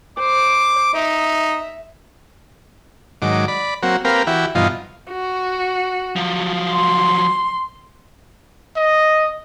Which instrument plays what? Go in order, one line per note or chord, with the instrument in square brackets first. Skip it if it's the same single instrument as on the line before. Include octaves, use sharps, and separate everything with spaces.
[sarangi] C5 [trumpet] D6
[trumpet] D#4 [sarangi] E5
[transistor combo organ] G#2 D#3 F#3 D6
D5 B5
F#3 A#3 C4 F#4
A#3 C4 G4 A#4 B4 F5
E3 E4 F#4 G4
G2 B2 E3 F3 D#4 F4
[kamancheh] F#4
[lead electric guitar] F3 F#3
[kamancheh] C6
[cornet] D#5